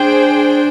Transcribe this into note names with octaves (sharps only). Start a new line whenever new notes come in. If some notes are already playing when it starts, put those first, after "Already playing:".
Already playing: D4 G#4 C5 G5